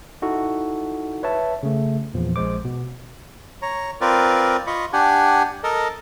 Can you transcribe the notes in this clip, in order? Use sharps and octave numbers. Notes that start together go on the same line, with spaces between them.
D#4 E4 F#4 A4
B4 C#5 E5 A5
C#3 A3
E2 A#2 F3
A#1 G#3 C5 D6
B2
C#5 A#5
C4 F4 A#4 B4 D5
F4 D#5 B5 C#6
D4 G4 F#5 G#5
A4 A#4 D#5